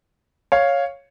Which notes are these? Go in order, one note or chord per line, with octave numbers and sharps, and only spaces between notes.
C#5 F5